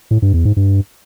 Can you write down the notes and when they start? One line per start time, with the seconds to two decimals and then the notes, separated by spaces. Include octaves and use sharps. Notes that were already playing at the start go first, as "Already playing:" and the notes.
0.11 A2
0.22 G2
0.34 E2
0.45 G#2
0.57 G2